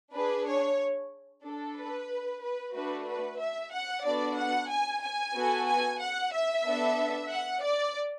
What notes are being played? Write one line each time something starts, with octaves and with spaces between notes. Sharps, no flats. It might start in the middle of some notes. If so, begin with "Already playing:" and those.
D4 G#4 B4
C#5
D4 A4
B4
B4
A3 D4 F#4 B4
B4
E5
F#5
B3 D4 F#4 A4 D5
F#5
G#5
G#5
B3 F#4 A4
G#5
F#5
E5
B3 D4 A4
F#5
D5